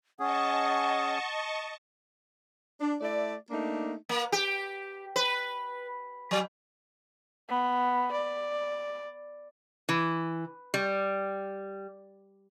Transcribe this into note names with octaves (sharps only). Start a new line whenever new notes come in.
C#4 G#4 D#5 F#5 A5 C#6
D4
A3 E4 D5
A3 A#3 D4 D#4
A#3
G4
B4
F#3
B3
D5
E3
G3